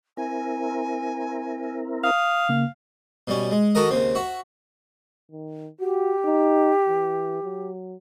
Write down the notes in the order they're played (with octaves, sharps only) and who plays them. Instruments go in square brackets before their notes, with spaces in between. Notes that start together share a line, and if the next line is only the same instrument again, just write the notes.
[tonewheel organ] C4 E4 A#4 [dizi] G#5
[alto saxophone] F5 [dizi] D#6
[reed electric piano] C#3 A#3
[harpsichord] B2 G3 C#4
G#3
D#3 F#4 A4 A#4 D#5
D#2 C#3 C4
F#4 E5
[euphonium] D#3
[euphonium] F#4 [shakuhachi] G4
[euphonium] D#4
E3
F#3